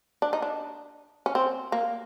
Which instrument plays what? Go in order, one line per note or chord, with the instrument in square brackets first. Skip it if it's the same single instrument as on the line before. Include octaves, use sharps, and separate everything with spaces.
[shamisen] D4
D#4
D4
C#4
C4
A#3